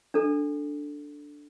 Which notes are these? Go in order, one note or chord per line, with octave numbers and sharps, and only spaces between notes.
D4 A4